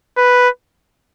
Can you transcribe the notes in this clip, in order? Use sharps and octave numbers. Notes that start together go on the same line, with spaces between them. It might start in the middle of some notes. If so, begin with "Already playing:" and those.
B4